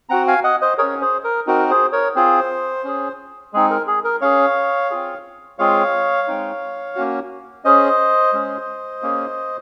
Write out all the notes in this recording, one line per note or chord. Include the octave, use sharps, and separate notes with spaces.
C4 F#4 F#5 A#5
F5 G#5
D#5 F#5
C5 D#5
C#4 G#4 A#4 C#5
G#4 C5
A#4
C4 D#4 F#4 A#4
G#4 C5
A#4 C#5
C4 F4 G#4 C5
C#4 G#4
G#3 C4 D#4 G#4
A#4
G#4
A#4
C#4 G#4 C#5 F5
C4 F4 G#4
G#3 C4 F4 G#4 C#5 F5
G#3 C4 D#4
A#3 C#4 F#4
C#4 G#4 C5 D#5
G#3 C#4 G#4
A#3 C#4 G#4